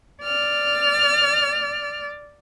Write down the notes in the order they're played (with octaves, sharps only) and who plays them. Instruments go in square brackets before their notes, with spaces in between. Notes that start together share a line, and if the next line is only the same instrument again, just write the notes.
[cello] D5 [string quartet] F6